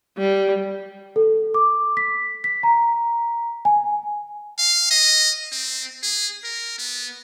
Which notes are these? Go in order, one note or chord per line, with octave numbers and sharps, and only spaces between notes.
G3
A4
D6
B6
B6
A#5
G#5
F5
D#5
C4
G#4
A#4
B3